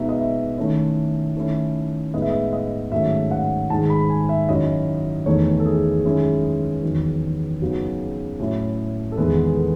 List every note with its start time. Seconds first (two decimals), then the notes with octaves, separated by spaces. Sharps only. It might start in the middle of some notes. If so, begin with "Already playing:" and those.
Already playing: B2 G#3 B3 D#4 E5
0.09 D#5
0.19 E5
0.57 D#3 A3 C#4 E4
1.36 D#3 A3 C#4 E4
2.14 A2 G#3 B3 D#4 D#5
2.22 E5
2.30 D#5
2.53 D#5
2.92 G#2 D#3 F#3 A3 C#4 E5
3.31 F#5
3.70 G#2 D#3 G#3 A5
3.90 B5
4.10 G#5
4.29 E5
4.49 F#2 D#3 F#3 C#4 E4 D#5
5.26 E2 D#3 A3 D#4 C#5
5.59 A4
5.66 G#4
6.05 F#2 D#3 G#3 C#4 E4
6.83 E2 D#3 F#3
7.61 F#2 C#3 F#3 B3 D#4 F#4
8.39 A2 F#3 C#4 E4
9.12 A4
9.17 E2 D#3 G#3 B3 B4
9.56 A4